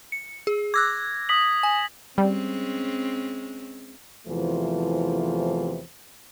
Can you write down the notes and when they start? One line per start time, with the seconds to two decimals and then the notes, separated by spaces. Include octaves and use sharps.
0.12 C#7
0.47 G#4
0.74 D6 E6 F#6 G#6 A#6
1.29 D#6 B6 F#7
1.63 G#5
2.18 G3 G#3 C4 C#4
4.27 E2 C3 E3 F3 A3 C5